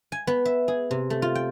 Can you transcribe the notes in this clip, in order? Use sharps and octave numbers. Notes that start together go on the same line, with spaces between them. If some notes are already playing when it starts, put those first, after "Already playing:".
G#5
B3
E5
G#4
C3
A3
F4
G5